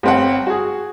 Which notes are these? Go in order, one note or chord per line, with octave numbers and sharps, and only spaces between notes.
G1 C4 F#5
F#4 G#4